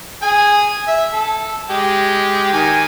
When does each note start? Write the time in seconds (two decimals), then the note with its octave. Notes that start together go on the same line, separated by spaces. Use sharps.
0.22 G#4 G#5
0.88 E5
1.13 A4
1.70 G#3 G4
2.53 D#3 G#5